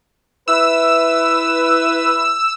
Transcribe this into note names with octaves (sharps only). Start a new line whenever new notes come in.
E4 B4 E6